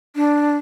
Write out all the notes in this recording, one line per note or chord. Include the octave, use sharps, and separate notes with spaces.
D4